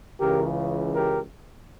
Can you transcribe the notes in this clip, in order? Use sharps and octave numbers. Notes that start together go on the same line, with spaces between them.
C#2 C#3 E3 G4 A#4
G4 A#4